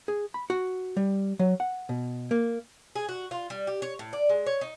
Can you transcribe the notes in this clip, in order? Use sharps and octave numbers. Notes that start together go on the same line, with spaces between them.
G#4
B5
F#4
G3
F#3
F#5
B2
A#3
G#4
F#4
F4
G3
G4
C#5
A2
D5
G#3
C#5
D#4